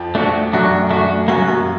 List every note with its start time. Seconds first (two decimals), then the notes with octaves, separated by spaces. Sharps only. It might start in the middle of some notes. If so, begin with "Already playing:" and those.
Already playing: F2 F3
0.15 A3 D4 F#4
0.53 F#2 F#3 A3 D4 F#4
0.91 A3 D4 F#4
1.28 F#2 F#3 A#3 C#4 F#4
1.47 F#2 F#3